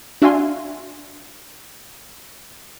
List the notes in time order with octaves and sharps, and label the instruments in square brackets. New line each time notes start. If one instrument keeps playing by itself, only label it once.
[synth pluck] D4 F#4 E5 F5 G#5 C6